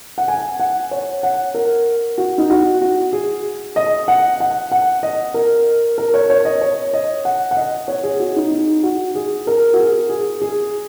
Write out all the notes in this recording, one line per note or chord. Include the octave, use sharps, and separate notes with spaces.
F#5
G#5
F#5
C#5
F#5
A#4
F#4
D#4
F#4
F#4
G#4
D#5
F#5
F#5
F#5
D#5
A#4
A#4
C#5
C#5
D#5
C#5
D#5
F#5
F#5
D#5
C#5
G#4
F#4
D#4
D#4
F#4
G#4
A#4
F#4
G#4
G#4
G#4